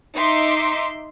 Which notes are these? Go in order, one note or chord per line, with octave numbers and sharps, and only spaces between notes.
D#4 E5 C6 D6